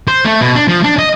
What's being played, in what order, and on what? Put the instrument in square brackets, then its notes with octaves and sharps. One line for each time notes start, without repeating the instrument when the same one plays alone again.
[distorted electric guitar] C5
A3
B2
D4
F3
D4
D#5